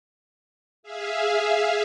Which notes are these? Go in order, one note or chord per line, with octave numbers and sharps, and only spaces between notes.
G#4 E5 F5